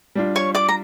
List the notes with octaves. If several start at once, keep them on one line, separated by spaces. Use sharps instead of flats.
G3 D4 F4
C#5 C#6
D5 D6
A#5